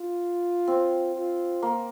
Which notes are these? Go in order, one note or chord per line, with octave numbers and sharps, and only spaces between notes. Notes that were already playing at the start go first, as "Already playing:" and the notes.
Already playing: F4
C4
F4
A#3